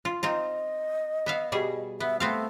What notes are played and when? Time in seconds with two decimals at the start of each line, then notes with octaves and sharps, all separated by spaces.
0.05 F4
0.23 C4 D#4 F4 D#5
1.26 B3 E5 F5
1.52 B2 G3 G#4
2.00 B3 E5
2.20 A3 B3 C4 F5